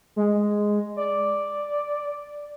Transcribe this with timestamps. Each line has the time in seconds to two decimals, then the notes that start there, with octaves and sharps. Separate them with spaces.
0.16 G#3
0.97 D5